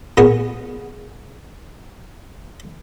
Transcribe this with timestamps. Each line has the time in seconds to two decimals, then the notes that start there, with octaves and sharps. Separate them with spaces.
0.17 A#2 B3 G#4